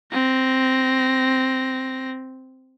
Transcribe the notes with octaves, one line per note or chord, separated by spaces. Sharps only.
C4 A#6